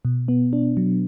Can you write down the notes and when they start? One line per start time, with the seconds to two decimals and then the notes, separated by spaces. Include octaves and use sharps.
0.05 B2
0.28 B3
0.53 D4
0.77 F#3